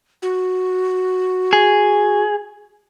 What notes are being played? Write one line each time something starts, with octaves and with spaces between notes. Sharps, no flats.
F#4
G#4